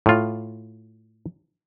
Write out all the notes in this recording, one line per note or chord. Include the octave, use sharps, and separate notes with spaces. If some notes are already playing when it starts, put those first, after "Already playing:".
A2 F4